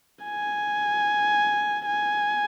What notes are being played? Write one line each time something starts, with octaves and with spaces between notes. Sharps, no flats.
G#5
G#5